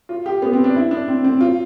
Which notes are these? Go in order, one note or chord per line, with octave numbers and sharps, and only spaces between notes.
F4
G4
B3
C4
D4
E4
D4
C4
C4
F4